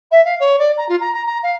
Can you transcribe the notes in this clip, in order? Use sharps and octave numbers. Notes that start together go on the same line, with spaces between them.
E5
F5
C#5
D5
A#5
F4
A#5
A#5
A#5
F5